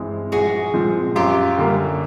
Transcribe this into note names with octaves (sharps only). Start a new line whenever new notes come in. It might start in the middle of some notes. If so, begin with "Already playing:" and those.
Already playing: G2 E3 G#3 C4
A#1 F#4 G#4
A#2 F3 G#3 C4
F#2 F4 G4
D3 G3 A#3